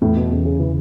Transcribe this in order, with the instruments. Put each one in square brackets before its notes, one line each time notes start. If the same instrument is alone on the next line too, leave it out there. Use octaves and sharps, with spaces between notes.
[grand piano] E2 [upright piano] A2
[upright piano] B2
[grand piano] E2 [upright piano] C#3
[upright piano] C#3
[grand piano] C#3 [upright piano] E3